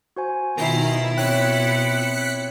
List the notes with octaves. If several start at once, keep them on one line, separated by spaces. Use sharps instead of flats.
F#4 C5 G#5
B2 D#3 E4 F4 A#5 C7
C4 C#5 G5 F#6 B6 C#7